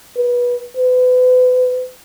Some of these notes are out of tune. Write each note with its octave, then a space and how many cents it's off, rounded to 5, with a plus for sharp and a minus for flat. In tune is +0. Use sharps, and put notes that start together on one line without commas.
B4 -20
B4 +35